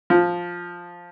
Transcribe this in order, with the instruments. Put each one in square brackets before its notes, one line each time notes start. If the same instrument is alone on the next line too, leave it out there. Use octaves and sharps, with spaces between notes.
[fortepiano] F3